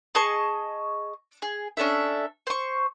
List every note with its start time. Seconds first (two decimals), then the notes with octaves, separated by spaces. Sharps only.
0.15 G#4 D#5 A5 C#6
1.42 G#4
1.77 C#4 D4 A4 E5
2.47 C5 C#6